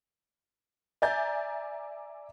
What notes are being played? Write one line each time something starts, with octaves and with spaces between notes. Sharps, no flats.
D5 E5 G#5 A#5 G6 A6